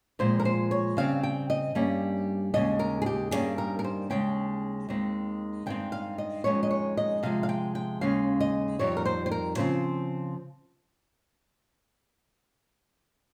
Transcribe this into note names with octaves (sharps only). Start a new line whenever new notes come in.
A#2 F3 G#3 C4 C5
A#4
C5
C#5
C#3 G3 C4 F5
G5
D#5
G2 G3 A#3 C#4
D#2 C#3 G#3 D#5
A#4
G#4
G4
G2 D#3 G3 A#3 C#4 G#4
A#4
A#4
C5
D#2 C#3 G#3 C#4 G5
D#2 D#3 G#3 C4
G2 D#3 G#3 C4 G5
F5
D#5
F2 C3 D#3 G#3 C#4 C#5
D#5
C#5
D#5
C3 F3 G#3 F5
F5
G5
G5
D#2 C#3 G#3 C#4 F5
D#5
F2 D#3 G3 C4 C#5
A#4
C5
C5
A#4
C#3 F3 C4 C5